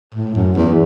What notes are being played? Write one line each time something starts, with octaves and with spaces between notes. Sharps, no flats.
A2
F#2
E2